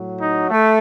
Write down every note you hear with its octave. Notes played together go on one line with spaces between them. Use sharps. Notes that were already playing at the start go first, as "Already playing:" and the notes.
Already playing: A2 F#3
D#4
A3